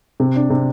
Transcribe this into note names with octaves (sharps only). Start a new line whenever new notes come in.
C3
D4
C3